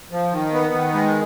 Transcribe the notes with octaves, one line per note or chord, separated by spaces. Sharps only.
F3
D#3
B3
D#3
G#3